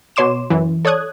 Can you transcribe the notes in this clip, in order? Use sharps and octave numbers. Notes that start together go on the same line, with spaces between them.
B2 C#5 C6 D6 E7
F#2 E3
A4 C#5 D5 D#6 F#6 G#6